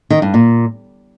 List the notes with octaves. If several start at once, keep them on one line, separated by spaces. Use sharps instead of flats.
D#3
G2
A#2